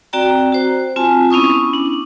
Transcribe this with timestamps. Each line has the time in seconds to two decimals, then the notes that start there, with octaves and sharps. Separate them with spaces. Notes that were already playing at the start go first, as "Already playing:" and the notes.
0.13 C4 F#4 D5 G5 A#5
0.52 F#4 C5
0.96 C4 F4 G#5 A5
1.30 B3 C#4 E4 C#6 D#6
1.73 D4